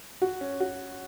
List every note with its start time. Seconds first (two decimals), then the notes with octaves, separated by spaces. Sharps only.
0.22 F#4
0.41 C#4
0.60 F#4